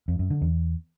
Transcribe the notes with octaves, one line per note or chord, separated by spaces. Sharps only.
F2
F#2
D3
E2